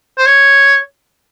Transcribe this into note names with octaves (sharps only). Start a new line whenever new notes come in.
C5
C#5